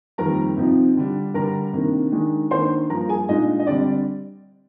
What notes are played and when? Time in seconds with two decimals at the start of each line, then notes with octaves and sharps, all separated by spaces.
0.18 F2 D#3 G3 A#3 A#4 A#5
0.57 C3 F3 C4 D#4
0.96 D3 G3 D4
1.34 D3 G3 D4 A#4 A#5
1.73 C3 D#3 A#3 D4
2.12 D#3 G#3 D4
2.51 D#3 A#3 D4 C5 C6
2.89 G2 F3 A#3 A#4 A#5
3.09 G#4 G#5
3.28 A#2 G#3 D4 D#4 D#5
3.59 D#5
3.67 D3 G3 C4 D4 D5